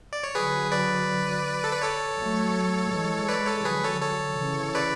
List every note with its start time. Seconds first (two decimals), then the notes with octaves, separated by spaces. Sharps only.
0.13 D5
0.24 C#5
0.35 D3 F#3 G#4 B4
0.72 B4 D5
1.64 A4
1.73 B4
1.82 A4 C#5
2.19 F#3 A3
2.92 E3 G#3
3.28 B4 D5
3.47 A4 C#5
3.65 D3 F#3 G#4 B4
3.84 A4 C#5
4.01 A4 C#5
4.39 C#3 E3
4.75 B4 D5